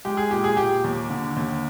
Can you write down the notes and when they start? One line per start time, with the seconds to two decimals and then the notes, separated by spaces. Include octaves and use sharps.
0.05 G#3 G4
0.17 G#4
0.31 A#2 G4
0.44 G#4
0.57 A#2 G4
0.84 D#2
1.10 D3
1.36 D#2